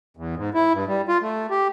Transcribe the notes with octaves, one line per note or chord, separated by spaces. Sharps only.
E2
G#2
E4
G2
G3
F4
A3
G4